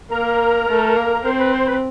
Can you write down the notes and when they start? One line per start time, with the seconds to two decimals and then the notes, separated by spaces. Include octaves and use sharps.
0.11 A#3 A#4 A#5
0.68 A3
0.96 A#3
1.24 C4 C5 C6
1.38 B4 B5
1.52 C5 C6
1.66 B4 B5